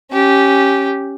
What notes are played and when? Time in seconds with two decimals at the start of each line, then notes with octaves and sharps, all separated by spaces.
0.12 C#4 G4